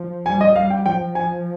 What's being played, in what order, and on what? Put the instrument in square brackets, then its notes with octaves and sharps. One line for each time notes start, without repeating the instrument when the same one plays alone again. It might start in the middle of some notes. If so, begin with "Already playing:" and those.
Already playing: [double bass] F3
[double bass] G3 [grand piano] G#5
[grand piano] D#5
[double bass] G3 [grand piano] F5
[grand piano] G5
[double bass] F3 [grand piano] G5
[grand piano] G#5